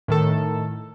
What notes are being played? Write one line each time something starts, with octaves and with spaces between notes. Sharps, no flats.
A2 D#3 A4